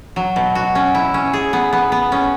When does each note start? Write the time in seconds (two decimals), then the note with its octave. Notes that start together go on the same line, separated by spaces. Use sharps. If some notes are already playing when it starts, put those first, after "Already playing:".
0.16 F#3
0.36 B2
0.55 F#4
0.75 C#4
0.95 E4
1.14 C#4
1.33 G#4
1.53 B3
1.73 B3
1.92 B3
2.12 C#4